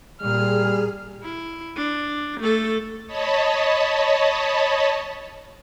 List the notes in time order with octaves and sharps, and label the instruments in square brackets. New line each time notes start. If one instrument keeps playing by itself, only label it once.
[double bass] A#2 [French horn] G3 [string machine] G#4 [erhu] F6
[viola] E4
D4
A3 A4
[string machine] C#5 D#5 A5 B5